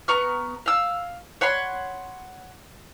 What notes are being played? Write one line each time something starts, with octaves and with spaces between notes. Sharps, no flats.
B3 A#5 C#6 F6
F5 E6
C#5 F#5 B5 C6